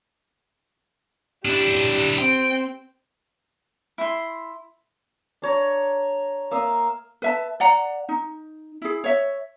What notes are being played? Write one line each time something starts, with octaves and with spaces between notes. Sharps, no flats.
D4 E4 G4
C4 G5
E4 C6
D4 C#5 A#5
A#3 E5 F5 D#6
B4 E5 A5
D5 F#5 A#5
D#4
E4 G#4
C#5 E5